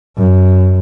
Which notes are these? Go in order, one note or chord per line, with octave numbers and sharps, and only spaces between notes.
F#2